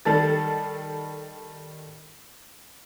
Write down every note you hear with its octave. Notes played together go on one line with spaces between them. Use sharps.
D#3 G3 A4 A6